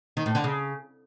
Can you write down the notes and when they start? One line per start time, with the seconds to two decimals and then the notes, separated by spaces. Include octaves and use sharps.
0.17 D#3
0.26 A2
0.35 D3
0.44 C#3